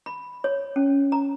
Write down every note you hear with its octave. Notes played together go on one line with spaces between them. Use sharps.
B5
C#5
C#4
A#5